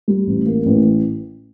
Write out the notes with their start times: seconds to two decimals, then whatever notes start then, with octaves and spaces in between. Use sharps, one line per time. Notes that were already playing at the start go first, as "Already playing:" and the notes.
0.08 G3
0.27 A1
0.46 A#3
0.66 A1